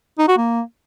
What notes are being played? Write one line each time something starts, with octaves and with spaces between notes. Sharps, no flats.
D#4
F#4
A#3